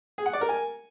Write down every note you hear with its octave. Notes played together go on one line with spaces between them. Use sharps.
G#4
F#5
D5
A#4
G#5